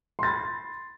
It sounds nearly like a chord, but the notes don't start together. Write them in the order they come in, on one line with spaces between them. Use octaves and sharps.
C6 A6 B5